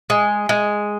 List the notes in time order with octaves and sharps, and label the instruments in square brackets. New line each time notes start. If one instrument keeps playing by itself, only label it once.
[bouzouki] G#3 [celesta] G#5
[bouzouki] G#3